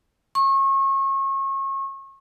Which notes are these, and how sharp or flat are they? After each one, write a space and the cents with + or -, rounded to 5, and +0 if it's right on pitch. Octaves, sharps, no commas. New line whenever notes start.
C#6 -35